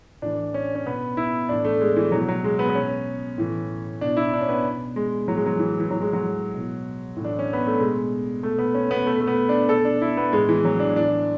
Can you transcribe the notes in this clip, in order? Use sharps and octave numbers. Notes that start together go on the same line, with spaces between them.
A2 E3 D4
C#4
C#4
B2 B3
E4
A2 E3 D4
A3
G#3
E3
B2 F#3
F#3
G#3
B3
B3
B2 C#4
A2 E3
B2 D4
E4
D4
C#4
B3
B2
G#3
A2 E3 F#3
G#3
F#3
E3
E3
A2 E3 F#3
G#3
F#3
B2
A2
E3 D4
C#4
B3
A3
B2 G#3
B2 A3
B3
C#4
B3
B2 A3
A3
B3
D4
B2 A4
D4
E4
B3
A2 E3 G#3
E3
F#3
D4
A2 E3 D4